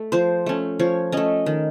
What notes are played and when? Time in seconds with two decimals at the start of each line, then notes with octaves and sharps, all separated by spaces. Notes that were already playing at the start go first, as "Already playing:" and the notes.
Already playing: A3
0.12 F3 C5
0.46 A3 C#4
0.79 F3 C#5
1.12 A3 C#4 D#5
1.46 D#3